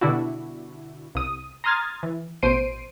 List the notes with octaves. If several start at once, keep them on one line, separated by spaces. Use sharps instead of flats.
B2 D3 G3 D4 E4 F#4
C2 D#6
A#5 C6 D#6 F6 G#6 A6
E3
A1 B2 C5 C7 D7 D#7